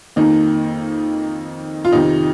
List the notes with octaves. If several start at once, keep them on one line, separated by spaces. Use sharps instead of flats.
F2 D#3 A#3 D#4
F4
F2 C3 D#3 D#4